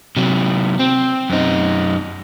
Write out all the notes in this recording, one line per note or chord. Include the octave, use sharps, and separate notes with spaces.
C3 F#3
C4
F#2 D#4